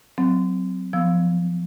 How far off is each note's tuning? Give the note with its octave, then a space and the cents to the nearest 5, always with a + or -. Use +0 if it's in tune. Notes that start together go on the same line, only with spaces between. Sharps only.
F#3 +0 C4 -20
F3 +0 B3 +25 E6 +0